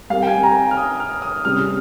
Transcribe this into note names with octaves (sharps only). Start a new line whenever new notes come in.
G3 C4 G4 A#4 F5
G5
G#5
A#5
F6
D#6
F6
D#6
C3 G3 C#4 G#4 F6